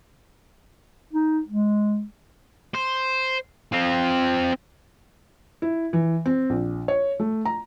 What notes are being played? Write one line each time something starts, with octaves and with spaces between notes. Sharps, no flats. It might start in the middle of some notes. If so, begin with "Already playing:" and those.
D#4
G#3
C5
C4 F4
E4
E3
C4
A#1
C#5
A3
A#5